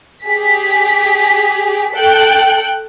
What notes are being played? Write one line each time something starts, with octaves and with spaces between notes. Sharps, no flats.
G4 G#4 B6
A4 G5 F#6